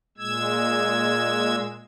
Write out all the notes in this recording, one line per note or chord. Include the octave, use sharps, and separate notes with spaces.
A#2 G#3 E6 G#6